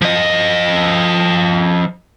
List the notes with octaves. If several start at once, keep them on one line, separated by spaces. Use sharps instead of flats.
F3 D#5